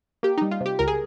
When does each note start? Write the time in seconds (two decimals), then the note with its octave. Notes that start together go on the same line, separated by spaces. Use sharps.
0.23 A#3 G4
0.37 G3 D#4
0.51 F4
0.61 C3
0.66 G4
0.79 C#2 A#4
0.88 G#4